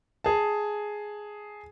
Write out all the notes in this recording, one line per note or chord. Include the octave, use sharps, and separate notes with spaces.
G#4 A5